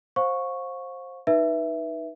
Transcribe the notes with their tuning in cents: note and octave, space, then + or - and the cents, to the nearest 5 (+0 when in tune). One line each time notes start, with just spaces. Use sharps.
C5 +15 F5 +35 C#6 +0
D#4 +0 B4 -15 E5 +0